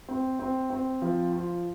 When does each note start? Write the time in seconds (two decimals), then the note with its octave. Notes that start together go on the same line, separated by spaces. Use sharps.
0.09 C4
0.39 C4
0.70 C4
1.02 F3
1.33 F4